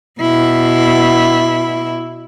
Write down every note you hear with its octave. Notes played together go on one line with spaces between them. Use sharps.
B2 E4